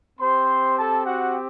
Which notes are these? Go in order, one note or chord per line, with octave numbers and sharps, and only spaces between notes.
C4 G4 C5 C6
A4 A5
F#4 F#5